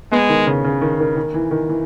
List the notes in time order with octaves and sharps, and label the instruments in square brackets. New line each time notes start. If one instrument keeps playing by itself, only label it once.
[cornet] G#3 [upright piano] B3
[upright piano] D#3
C#3
C#3
D#3
D#3
D#3
E3
D#3
E3